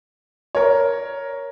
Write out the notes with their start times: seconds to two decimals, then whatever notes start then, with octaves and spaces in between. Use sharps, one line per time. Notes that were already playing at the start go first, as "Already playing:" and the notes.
0.55 A#4 C#5